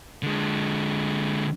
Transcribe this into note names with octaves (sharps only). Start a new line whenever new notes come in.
D3 G#3